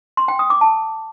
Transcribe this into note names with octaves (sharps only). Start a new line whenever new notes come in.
C6
G5
D#6
D6
A5